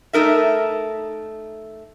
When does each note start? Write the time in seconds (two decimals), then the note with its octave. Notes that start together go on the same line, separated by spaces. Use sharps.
0.13 A3 D#4 A#4 E5